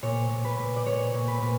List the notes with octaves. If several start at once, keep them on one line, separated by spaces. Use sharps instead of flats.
A#2 C#5
A#2
B4
A#2
D5
A#2 C#5
A#2
B4
A#2